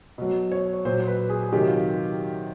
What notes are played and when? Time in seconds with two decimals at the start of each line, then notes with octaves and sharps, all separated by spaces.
0.18 B2 F#3
0.52 C#5
0.73 C#5
0.85 A#2 F#3 C5
1.07 B4
1.30 G#4
1.43 G#4
1.52 C3 D#3 F#3 G4
1.68 F4